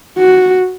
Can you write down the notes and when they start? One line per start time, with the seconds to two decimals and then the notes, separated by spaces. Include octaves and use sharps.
0.18 F#4